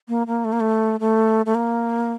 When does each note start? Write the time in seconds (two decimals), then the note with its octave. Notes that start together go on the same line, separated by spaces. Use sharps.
0.08 A#3
0.27 A#3
0.45 A3
0.53 A#3
0.60 A3
1.00 A3
1.46 A3
1.55 A#3